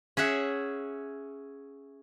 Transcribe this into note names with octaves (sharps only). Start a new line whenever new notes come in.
C#4 G#4 E5 F#5